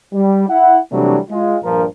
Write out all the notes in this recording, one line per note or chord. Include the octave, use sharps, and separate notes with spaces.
G3
E4 F#5
C3 E3 F#3 G3 A3 D4
G#3 F4
A#1 G2 F3 A#4